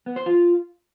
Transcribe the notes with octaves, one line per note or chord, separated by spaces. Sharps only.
B3
C5
F4